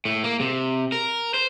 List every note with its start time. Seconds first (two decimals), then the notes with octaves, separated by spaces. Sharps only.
0.05 A2
0.24 A#3
0.40 C3
0.92 A#4
1.34 C5